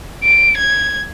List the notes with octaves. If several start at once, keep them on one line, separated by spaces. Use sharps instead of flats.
D7
G#6